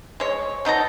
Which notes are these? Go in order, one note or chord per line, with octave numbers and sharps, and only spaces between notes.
G#3 C#5
B2 D#4 A4 A#5